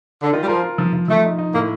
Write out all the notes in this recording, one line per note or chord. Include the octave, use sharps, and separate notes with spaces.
D3
D#3 F4
G3
F3 A#4
F4
F3
F3
F3 A3
D#4
D#4
A2 A#3